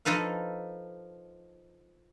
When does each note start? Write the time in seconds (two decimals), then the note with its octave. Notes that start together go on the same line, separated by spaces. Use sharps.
0.05 F3 D#4 A4 B4 F5